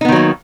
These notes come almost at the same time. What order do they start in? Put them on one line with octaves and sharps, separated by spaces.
D#4 B3 D#3 F#3 A#3